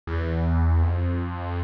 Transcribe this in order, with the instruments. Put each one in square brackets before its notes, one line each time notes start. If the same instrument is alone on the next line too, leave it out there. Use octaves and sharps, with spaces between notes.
[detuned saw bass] E2
F2